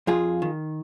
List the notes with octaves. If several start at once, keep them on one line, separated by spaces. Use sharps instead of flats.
F2 F4 G#4
D#3